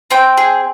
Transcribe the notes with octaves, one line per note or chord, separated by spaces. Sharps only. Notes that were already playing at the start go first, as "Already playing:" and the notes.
C4 G5
G#4